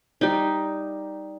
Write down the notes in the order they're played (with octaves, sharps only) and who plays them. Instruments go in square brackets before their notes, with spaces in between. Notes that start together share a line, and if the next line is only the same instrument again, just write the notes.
[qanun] G3 D#4